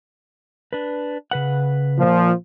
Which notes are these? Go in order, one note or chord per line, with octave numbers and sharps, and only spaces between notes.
D4 B4
C#3 B4 F#5
A#2 F3